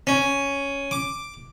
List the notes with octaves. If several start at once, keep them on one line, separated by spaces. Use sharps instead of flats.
C#4
D6